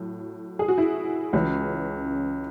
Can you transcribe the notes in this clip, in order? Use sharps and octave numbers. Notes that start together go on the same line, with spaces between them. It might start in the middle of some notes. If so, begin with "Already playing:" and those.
Already playing: A2 F#3
G#4
F#4
E4
C#2 C#3 E3 C#4